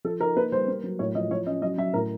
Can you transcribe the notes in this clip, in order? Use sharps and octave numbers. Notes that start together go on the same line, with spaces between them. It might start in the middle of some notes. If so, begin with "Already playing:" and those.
F3 A4
D#4 A#4
A#3 B4
G3 C5
A#3
F#3
A2 C#5
F3 D#5
F3 C#5
C#4 D#5
F#3 D#5
F#3 E5
A2 A#4